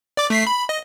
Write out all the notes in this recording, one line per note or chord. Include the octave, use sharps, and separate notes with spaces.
D5 D6
A3 B6 C7
B5
D#5